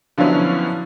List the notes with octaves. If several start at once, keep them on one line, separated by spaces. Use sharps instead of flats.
D3 F3 F#3 B3 C#4 E4